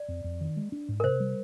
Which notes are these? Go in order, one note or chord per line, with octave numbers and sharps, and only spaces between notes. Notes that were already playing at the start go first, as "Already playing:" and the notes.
Already playing: D5
F2
F2
D#3
G#3
D4
G#2
A#4
C3 C5
G3